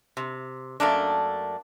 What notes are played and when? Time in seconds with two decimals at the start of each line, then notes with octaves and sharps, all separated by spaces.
0.17 C3
0.80 F#2 A3 A#3 D4